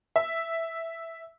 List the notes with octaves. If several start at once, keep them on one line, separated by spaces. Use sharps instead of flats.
E5